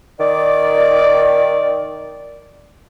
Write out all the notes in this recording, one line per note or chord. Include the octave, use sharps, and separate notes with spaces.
D#3 D5